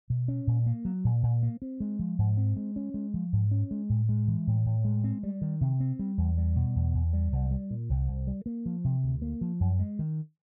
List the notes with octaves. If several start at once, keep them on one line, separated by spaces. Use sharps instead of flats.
B2
C#4
A#2
A#3
F#3
A#2
A#2
A#3
C4
G#3
F3
G#2
C4
G#3
C#4
G#3
F3
G#2
C#4
G#3
A2
G#3
E3
A2
A2
G#3
C4
G3
D#3
C3
C4
G3
E2
G3
B2
E2
E2
G3
C2
G3
A#2
C2
C2
G3
A#3
F3
C3
D2
A#3
F3
F#2
G#3
D#3